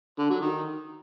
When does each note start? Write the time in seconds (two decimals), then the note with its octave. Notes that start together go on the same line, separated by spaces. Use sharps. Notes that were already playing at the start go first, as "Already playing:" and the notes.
0.18 D3
0.30 F#3
0.41 D#3